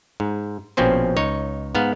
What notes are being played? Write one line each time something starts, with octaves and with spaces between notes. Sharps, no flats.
G#2
A#1 B2 F3 C4 C#4 C5
C#2 D#4 C#5
G#2 B3 F5